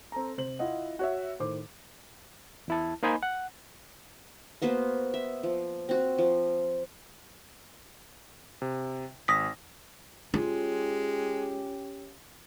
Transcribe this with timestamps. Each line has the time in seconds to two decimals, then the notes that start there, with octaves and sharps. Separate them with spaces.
0.12 C4 A4 A#5
0.38 C3 C5 F#7
0.59 E4 F4 D#5 F#5
0.99 F#4 C#5 E5
1.39 A2 D#3 C5 D6
2.68 E2 E4 A5
3.03 A#3 D#4 C5 D#5 G#5 B5
3.23 F#5
4.62 A#3 B3 F#4 C5
5.14 E5
5.43 F3
5.89 C4 F#4
6.18 F3
8.62 C3
9.28 G#1 D#6 A#6 B6
10.34 G#3 C#4 F4 G4